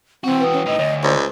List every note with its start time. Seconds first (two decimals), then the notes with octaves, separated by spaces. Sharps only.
0.24 E3 C4 F#4
0.40 B4 G5 D#6
0.53 C#4
0.66 A2 D#4 D#5
0.79 D2 C#5
1.03 C#2 C5 D5